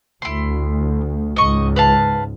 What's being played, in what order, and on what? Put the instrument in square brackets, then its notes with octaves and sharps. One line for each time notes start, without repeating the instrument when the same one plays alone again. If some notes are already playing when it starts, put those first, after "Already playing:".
[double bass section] D2 [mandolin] E4 C6
[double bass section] C#2 G#2 [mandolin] D#5 C#6
[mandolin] B4 F5 A5